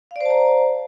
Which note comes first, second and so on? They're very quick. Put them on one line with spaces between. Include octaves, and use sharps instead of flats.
F5 D5 C5 A5 A#5